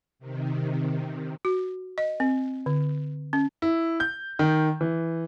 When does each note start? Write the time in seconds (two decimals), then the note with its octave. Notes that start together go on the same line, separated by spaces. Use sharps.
0.19 C3 D#3
1.45 F#4
1.98 D#5
2.20 C4
2.66 D3
3.33 C#4
3.62 E4
4.00 G6
4.39 D#3
4.81 E3